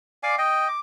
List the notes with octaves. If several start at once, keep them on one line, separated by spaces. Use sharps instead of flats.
D5 F5 G#5 D6
D#5 G5
D6